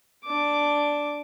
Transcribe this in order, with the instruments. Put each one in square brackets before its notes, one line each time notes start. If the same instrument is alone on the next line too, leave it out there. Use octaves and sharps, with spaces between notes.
[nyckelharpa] D4 D6